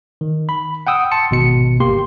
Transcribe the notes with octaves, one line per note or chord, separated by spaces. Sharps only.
D#3
B5
F#5 G5 D#6 E6
A5 C6 C#7
G#1 B2 C#7
G1 A#3 G4 C6